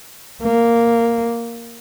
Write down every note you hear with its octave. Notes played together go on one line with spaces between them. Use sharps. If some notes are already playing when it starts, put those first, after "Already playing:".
A#3